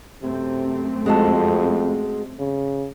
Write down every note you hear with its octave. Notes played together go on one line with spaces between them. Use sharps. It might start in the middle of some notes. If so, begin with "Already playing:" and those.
F#2 C3 A3 C4
F2 G#3 F#4 A4
C#3